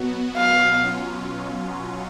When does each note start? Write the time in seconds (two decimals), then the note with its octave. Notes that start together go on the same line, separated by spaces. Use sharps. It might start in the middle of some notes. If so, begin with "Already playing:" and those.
Already playing: B2 F#3 B3 F#4
0.37 F5
0.81 B2 F#3 C#4 F4